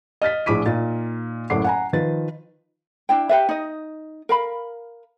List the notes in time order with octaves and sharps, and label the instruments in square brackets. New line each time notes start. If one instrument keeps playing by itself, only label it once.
[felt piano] D#5 F6 A6 B6
A#1 A2 G#4 D6 B6 D#7
A#2 D#4 A6
F#1 A2 A4 F#5 D6 C7
F#5 G#5 A#5
D#3 F3 B4 A6
[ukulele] D4 E4 G5
G4 B4 E5
D#4 D#5
A#4 F5 B5